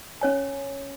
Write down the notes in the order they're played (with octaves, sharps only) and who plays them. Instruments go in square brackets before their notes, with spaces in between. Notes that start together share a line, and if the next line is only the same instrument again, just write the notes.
[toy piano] C#4 C#5 G#5